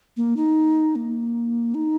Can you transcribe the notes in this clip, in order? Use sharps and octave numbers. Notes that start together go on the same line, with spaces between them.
A#3
D#4
A#3
D#4